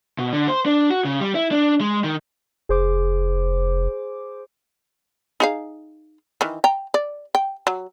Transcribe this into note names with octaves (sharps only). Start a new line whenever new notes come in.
B2
D3
C5
D4
F#4
C#3
G3
E4
D4
G#3
D#3
F1 G#4 C5 D6
D#4 G#4 F5
D#3 E3
G5 A#5
D5
G5
F#3